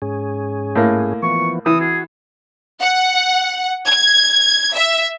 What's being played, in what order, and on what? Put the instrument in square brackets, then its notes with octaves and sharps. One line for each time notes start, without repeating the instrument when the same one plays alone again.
[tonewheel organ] G#2 C#4 G#4
[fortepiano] A2 A#3
[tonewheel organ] E3 F3 B3 [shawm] C#6
[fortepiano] E3 [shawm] D#6
[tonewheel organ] F#4 [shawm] G#4
[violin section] F#5
G#6
E5